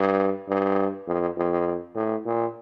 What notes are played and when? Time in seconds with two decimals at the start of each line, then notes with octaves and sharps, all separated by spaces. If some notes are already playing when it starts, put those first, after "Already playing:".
Already playing: G2
0.48 G2
1.07 F2
1.37 F2
1.95 A2
2.25 A#2